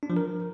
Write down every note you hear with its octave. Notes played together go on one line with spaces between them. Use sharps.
D4
F3
A#4